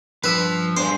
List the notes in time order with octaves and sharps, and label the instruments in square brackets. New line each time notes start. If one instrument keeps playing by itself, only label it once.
[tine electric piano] G2 E6 B6 [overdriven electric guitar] F3 [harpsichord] B4
[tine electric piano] G2 [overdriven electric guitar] D4 G#4 [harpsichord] C5